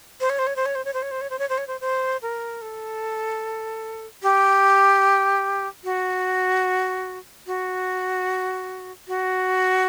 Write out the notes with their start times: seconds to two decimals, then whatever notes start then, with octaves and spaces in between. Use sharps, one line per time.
0.20 C5
0.30 C#5
0.39 C5
0.47 C#5
0.56 C5
0.66 C#5
0.75 C5
0.85 C#5
0.94 C5
1.02 C#5
1.11 C5
1.21 C#5
1.30 C5
1.39 C#5
1.49 C5
1.58 C#5
1.67 C5
1.81 C5
2.22 A#4
2.62 A4
4.23 G4
5.84 F#4
7.47 F#4
9.08 F#4